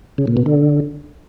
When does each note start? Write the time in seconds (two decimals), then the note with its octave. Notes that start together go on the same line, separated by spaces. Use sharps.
0.18 C#3
0.27 A#2
0.37 B2
0.46 D3